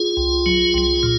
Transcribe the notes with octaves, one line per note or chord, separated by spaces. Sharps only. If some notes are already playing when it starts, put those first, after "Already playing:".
Already playing: F4 G#4
C2
F#3
C2
A#2